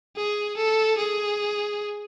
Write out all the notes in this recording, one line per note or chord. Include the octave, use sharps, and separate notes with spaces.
G#4
A4
G#4